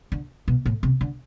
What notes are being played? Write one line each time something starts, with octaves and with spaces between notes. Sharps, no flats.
D3
B2
A2
C3
D3